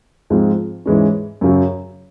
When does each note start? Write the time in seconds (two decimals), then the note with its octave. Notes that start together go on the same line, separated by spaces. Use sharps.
0.30 G#2 F3 G#3 C4 F4
0.86 G#2 E3 G#3 C#4
1.41 F#2 C#3 F#3